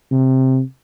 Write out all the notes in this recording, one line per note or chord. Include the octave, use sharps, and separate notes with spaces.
C3